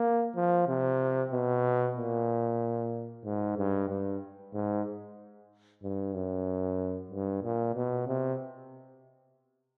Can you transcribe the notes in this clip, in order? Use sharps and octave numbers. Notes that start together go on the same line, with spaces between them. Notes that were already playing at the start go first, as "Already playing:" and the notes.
Already playing: A#3
F3
C3
B2
A#2
G#2
G2
G2
G#2
G2
F#2
G2
A#2
B2
C3